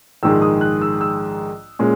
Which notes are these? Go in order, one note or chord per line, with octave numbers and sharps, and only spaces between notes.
A#1 G#2 D#3 G#3 E6
D#6
F#6
E6
E6
A#2 G#3 C#4